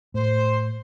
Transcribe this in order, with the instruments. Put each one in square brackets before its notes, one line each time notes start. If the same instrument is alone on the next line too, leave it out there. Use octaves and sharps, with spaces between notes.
[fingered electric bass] A2 [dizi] C5